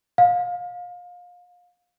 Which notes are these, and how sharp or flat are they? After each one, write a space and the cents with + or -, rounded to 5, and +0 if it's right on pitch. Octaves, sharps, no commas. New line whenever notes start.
F5 +30